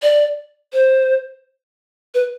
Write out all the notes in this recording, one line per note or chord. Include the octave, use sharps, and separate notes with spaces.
D5
C5
B4